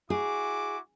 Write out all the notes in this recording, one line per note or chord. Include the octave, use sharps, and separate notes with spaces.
E4 F#4 G#4 D6